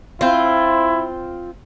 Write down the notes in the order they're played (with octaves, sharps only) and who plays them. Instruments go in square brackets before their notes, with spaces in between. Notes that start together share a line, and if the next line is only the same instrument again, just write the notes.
[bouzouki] C4 F4 [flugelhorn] E4